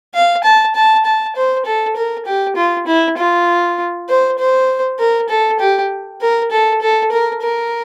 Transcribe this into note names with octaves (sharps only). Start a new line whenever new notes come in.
F5
A5
A5
A5
C5
A4
A#4
G4
F4
E4
F4
C5
C5
A#4
A4
G4
A#4
A4
A4
A#4
A#4